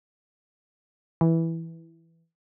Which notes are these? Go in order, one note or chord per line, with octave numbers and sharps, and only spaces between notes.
E3